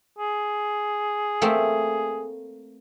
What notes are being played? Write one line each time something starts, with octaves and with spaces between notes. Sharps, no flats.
G#4
A3 A#3 C4